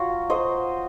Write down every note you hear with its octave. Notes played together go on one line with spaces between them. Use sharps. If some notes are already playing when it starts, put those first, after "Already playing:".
Already playing: F#3 F4 F#4
C5 D#5